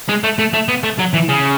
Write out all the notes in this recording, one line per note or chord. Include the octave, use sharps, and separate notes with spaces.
G#3
A3
A3
A3
B3
A3
F#3
E3
C#3